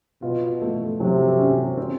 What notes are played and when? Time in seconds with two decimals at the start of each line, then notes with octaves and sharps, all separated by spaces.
0.22 B2 F4
0.61 A3
1.00 C3 F#3
1.38 C#4
1.77 C4